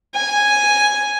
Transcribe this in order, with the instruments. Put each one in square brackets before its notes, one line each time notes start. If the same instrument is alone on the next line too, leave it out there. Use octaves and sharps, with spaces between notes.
[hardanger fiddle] G#5